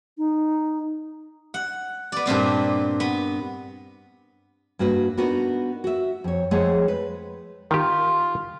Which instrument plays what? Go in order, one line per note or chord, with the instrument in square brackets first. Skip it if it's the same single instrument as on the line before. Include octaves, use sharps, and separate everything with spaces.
[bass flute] D#4
[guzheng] F#5
B3 D5
G2 A#2 C4 D5
B3
[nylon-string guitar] G2 A#3 F#4 B4
B3 D4 D#4 F#4 A#4 B4
F#4 E5
F2 C#5
F2 G#3 A3 G#4 C#5 F#5
B4
[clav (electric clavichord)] D#3 G4 [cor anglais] F4